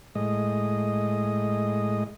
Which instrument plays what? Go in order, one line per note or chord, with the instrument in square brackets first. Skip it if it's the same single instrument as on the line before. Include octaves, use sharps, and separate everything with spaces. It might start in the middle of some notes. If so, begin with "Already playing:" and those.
[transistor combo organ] A2 G#3 D#5